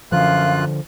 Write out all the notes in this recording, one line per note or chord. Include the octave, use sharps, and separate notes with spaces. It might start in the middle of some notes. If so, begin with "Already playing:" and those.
F#2 D3 F3 F4 F5 F#6